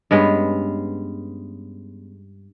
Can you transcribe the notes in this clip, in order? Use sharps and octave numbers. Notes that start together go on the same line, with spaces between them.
G2 G#3 B3 C#4